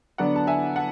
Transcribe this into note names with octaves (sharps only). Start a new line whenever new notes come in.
D3 F#3 B3 D4 D5 F#5
A5
E5 G#5
F#5 A5